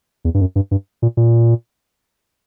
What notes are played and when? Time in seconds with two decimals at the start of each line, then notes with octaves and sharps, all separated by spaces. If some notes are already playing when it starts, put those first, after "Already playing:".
0.25 E2
0.34 G2
0.40 F#2
0.56 G2
0.71 G2
1.02 A#2
1.17 A#2